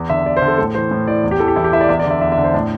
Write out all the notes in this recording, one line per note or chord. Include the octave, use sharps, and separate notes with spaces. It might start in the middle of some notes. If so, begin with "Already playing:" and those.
Already playing: E2
D3 E5
E2 D5
C5
D3
A4
A2 A4
E3 C5
A2
E3 D5
E2
G4
E3 A4
G4
E2 E4
G4
E3 E5
D5
E2 E5
D5
D3 E5
E2 E5
E5
D3
C5
A2 D4